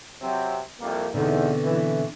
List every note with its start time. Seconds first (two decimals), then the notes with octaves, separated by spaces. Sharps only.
0.22 C3 F#3 C4
0.80 C2 F2 A#3
1.14 E2 B2 D3 C4 D#4
1.64 E3